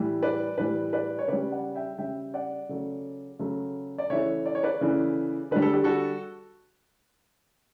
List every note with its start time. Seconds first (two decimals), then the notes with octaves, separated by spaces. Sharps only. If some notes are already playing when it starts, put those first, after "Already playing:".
Already playing: A2 E3 G3
0.23 B4 D5
0.58 A2 E3 G3 B4 D5
0.93 B4 D5
1.19 C#5
1.28 C#3 G3 B4 D5
1.51 D5 F#5
1.75 E5 G5
1.98 C#3 G3 E5 G5
2.34 D5 F#5
2.69 C#3 F#3 A3
3.39 C#3 F#3 A3
3.98 D5
4.10 C#3 E3 A3 C#5 E5
4.46 D5
4.55 C#5
4.63 B4 D5
4.81 C#3 E3 A3
5.51 D3 G3 B4
5.62 A4
5.73 G4
5.84 F#4 A4